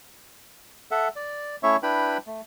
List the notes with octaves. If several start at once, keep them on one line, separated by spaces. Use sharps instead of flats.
A4 E5 F#5
D5
A3 C#4 E4 C#5 E5 C#6
D4 E4 B4 G5 B5
A3